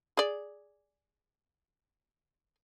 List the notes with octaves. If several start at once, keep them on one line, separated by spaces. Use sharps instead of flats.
G#4 D5